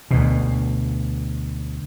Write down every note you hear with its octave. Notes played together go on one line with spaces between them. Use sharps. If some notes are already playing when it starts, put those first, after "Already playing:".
D2 B2